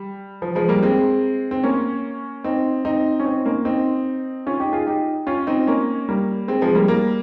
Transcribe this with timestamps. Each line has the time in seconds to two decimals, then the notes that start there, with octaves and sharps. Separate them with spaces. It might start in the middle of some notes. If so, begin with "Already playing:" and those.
Already playing: G3
0.42 F3
0.55 F3 G#3
0.68 G3 A#3
0.83 G#3 C4
1.51 C4
1.63 A#3 C#4
2.44 C4 D#4
2.85 C4 D#4
3.20 C#4
3.25 C4 D#4
3.45 A#3 C#4
3.65 C4 D#4
4.46 C#4 F4
4.59 D#4 G4
4.73 F4 G#4
4.87 D#4 G4
5.27 C#4 F4
5.47 C4 D#4
5.67 A#3 C#4
6.09 G3 A#3
6.48 G#3 C4
6.61 F3 G#3
6.75 G3 A#3
6.88 G3 A#3